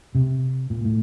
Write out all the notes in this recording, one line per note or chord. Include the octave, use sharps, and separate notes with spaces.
C3
A#2
A2